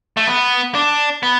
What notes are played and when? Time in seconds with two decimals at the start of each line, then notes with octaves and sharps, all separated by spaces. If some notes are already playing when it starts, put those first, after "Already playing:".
0.17 A3
0.27 B3
0.75 D4
1.23 B3